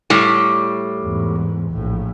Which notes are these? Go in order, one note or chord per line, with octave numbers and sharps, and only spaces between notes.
A2 G3
E2 G#2
A#1 A2